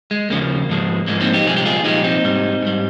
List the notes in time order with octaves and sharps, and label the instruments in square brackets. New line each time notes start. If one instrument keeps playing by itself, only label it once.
[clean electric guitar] G#3
D#2 C#3 F3 A#3
G#2 F3 G#3
G#2 F3 G#3 A#3
C4 D#4
D#4 G4
C2 A#2 F3 G#3 G#4
G4
F4 G#4
C2 A#2 F3 G#3 D#4 G4
C4 D#4
G#2 G3
G#2 G3